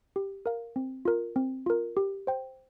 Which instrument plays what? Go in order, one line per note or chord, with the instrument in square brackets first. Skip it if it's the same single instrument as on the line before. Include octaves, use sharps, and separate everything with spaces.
[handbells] G4
A#4 F5
C4
F4 A#4
C4
F4 A#4
G4
C5 G5